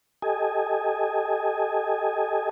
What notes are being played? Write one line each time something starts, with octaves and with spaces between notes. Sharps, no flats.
G4 A4 D#5 G#5